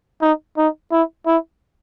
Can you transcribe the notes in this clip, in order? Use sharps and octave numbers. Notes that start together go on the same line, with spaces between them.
D#4
D#4
E4
E4